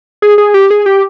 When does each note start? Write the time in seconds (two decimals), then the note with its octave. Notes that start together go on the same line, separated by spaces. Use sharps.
0.22 G#4
0.38 G#4
0.54 G4
0.71 G#4
0.86 G4